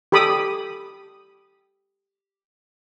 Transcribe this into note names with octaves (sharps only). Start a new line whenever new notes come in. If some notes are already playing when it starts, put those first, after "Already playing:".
G4 A4 B5 D6 D#6